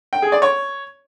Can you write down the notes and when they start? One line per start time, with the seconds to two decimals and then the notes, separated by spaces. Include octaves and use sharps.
0.13 G5
0.22 G#4
0.32 D5
0.42 C#5